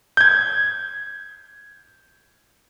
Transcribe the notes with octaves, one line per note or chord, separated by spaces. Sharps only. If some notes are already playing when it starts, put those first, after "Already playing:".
G6 G#6